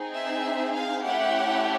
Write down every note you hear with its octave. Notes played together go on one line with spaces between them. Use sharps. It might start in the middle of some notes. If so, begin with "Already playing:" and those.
Already playing: C4 D#4 G#4
E5
F5
A3 C#4 E4 G4 F#5